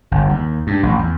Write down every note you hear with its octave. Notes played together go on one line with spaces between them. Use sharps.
G1
D#2
G2
A1
E2